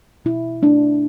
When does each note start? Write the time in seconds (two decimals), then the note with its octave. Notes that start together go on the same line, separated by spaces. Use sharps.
0.25 B2 E4
0.62 A3 D4